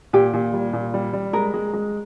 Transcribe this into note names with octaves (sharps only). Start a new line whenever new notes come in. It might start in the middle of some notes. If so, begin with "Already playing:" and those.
A#2 G4
A#2
G3
A#2
G3
G3
G#3 A#4
G#3
G#3